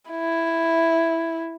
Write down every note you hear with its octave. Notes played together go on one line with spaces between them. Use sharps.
E4